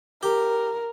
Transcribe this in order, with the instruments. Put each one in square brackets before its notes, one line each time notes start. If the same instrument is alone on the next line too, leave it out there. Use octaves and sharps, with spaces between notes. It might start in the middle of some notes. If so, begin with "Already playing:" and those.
[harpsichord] G4 [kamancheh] A#4